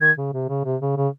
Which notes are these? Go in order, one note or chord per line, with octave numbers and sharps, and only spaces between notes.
D#3 G#6
C#3
C3
C#3
C3
C#3
C#3